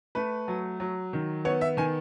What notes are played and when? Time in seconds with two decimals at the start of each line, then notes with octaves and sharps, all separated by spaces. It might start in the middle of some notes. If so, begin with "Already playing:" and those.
0.15 A3 B4
0.48 F#3
0.80 F#3
1.13 D#3
1.45 B3 C#5
1.61 E5
1.77 D#3 G#5